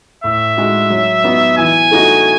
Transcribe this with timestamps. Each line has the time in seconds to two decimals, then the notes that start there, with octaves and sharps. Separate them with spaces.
0.24 A2 E5
0.57 G#3 D#4 F#4
0.90 F#3
1.24 B3 D#4 F#4 B4
1.57 E3 G#5
1.91 A3 D#4 F#4